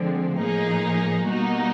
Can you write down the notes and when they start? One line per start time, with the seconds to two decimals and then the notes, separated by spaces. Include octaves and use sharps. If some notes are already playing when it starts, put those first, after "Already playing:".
Already playing: D3 F3 G#3 C4
0.38 A2 F3 A#3 D#4 G#4
1.26 B2 G3 A#3 D#4 F#4